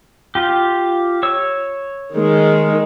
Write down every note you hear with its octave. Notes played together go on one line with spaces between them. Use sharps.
F4 G4
C#5 E6
D#3 G#3